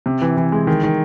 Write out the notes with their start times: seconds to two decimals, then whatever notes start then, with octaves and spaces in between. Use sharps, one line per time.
0.06 C3
0.22 E3
0.37 E3
0.52 G#3
0.67 D#3
0.84 D#3